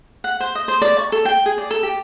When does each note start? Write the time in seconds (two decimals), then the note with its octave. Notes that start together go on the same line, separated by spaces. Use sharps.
0.24 F#5
0.40 C5
0.55 D#5
0.68 C5
0.82 D5
0.98 C#6
1.12 A4
1.25 G5
1.46 G#4
1.58 D5
1.71 A4
1.83 G4